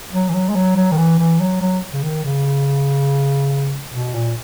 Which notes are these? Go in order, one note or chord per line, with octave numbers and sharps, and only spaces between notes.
F#3
E3
F#3
G#3
F#3
F#3
D#3
E3
E3
F#3
F#3
C#3
D#3
C#3
B2
A#2